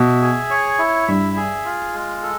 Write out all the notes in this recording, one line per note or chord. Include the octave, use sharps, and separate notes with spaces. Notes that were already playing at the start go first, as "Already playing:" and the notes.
Already playing: B2 E5
G#4
C#5
E4
G2 E5
G#4
F4
G#3
A4